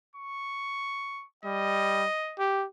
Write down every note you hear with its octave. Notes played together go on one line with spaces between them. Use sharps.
C#6
G3 D#5
G4